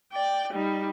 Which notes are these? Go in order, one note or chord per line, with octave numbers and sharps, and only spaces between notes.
D5 G5
G3 D#4